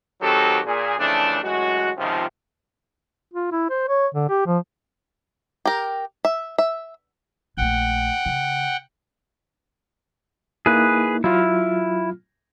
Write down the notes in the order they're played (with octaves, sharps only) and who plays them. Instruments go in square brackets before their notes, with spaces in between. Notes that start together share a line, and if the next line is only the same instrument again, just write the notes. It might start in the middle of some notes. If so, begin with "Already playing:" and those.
[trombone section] D#3 F#3 C4 F#4 G4 A4
A#2 G#4
F2 C#3 E3 A3 D4
A1 F#2 G#3 F#4
C#2 G#2 C3 D#3 F3
[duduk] F4
E4
C5
C#5
D3
G4
F3
[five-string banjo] G4 A#4
E5
E5
[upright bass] A#1 A3 [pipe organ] F#5 G5
[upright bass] C#3
[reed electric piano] A#3 D#4 E4 [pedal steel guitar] G#4 B4
[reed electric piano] F#3 F4 F6 [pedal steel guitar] E4